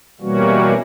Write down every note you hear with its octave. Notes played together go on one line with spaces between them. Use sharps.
B2 E3 G3 A#3 C#4 F#4